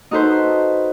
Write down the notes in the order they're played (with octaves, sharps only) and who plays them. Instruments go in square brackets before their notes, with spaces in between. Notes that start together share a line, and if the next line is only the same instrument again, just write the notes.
[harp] D#4 F#4 A4 B4 C5